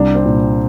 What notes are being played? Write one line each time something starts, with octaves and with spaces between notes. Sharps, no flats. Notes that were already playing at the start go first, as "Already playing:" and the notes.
Already playing: C2 D4
C4
A#2